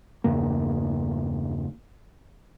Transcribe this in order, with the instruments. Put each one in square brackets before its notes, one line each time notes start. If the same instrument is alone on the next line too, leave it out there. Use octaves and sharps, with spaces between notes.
[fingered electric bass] E2 G2 C#3 A#3